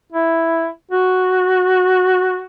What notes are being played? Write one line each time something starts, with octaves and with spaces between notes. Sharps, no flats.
E4
F#4